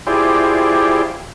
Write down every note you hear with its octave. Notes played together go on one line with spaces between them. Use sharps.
E4 F4 G4 G#4 C5 D5